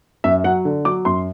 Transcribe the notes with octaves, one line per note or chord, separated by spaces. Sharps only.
F#2 E5
F#3 F#5
D3
F#3 D6
F#2 C6